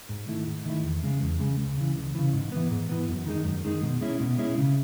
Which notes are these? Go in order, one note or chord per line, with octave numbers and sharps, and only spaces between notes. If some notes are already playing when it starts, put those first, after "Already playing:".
G#2
D#3 A3 E4
G#2
D#3 A3 E4
E2
C#3 G#3
E2
C#3 G#3
C#2
C#3 E3
C#2
C#3 E3
G#2
E3 B3
G#2
E3 B3
F#2
D#3 G#3 D#4
F#2
D#3 G#3 D#4
B2
G#3 C#4 E4
B2
G#3 C#4 E4
C#3